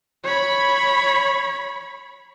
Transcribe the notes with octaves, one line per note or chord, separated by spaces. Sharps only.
C#5 B5